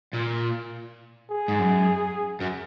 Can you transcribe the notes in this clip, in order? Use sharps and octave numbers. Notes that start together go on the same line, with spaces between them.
A#2
G#4
G#2
F#2
F#2